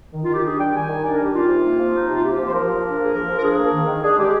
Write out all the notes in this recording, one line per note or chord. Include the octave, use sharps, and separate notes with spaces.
D#3
D#3 F4
G4
D4 G#4
G3 G5
D#3 G#5
D#3
D4 D5
A#4
G3 G4
D#4 F4
C3
A#3
F3
D#4
C3
F4
A#3 G4
F3
C5
F3 A#4
F3
D4
A#3 G#4
F3 A#4
F3
A#4
D4 G#4
A#3
D#3
D#3
D4 G#4
G#3 G4